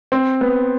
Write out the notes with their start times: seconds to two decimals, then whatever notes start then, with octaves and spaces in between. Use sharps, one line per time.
0.12 C4
0.41 B3